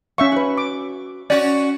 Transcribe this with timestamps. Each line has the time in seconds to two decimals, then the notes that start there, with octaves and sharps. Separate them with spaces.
0.18 C#4 E5 F5 C#6
0.32 F#4 B4
0.58 D6
1.30 C#4 F#4 D5